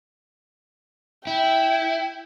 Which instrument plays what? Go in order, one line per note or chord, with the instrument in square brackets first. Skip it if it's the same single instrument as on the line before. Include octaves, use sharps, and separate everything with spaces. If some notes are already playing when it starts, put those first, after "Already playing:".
[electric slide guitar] E4 [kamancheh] G5